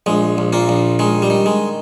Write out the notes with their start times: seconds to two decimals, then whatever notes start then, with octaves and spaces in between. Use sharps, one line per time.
0.06 A#1 G#3
0.38 A#1
0.53 A#2 A#3
0.69 A#1
0.99 D#3 G#3
1.22 G3
1.30 D#3
1.46 G#3